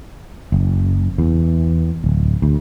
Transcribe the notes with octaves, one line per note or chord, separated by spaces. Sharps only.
F#1
E2
D1
D2